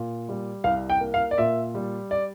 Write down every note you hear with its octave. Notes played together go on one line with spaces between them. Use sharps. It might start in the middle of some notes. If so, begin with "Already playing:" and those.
Already playing: A#2
G3
C2 F5
G5
A#3
F5
D5
A#2 E5
G3
D5